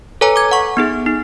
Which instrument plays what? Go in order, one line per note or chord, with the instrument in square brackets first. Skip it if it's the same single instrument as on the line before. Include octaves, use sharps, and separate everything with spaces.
[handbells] A4 B4 C#5 G#5 A#5
D6 G#6
F#5 C#6
B3 D#4 G#4
D#4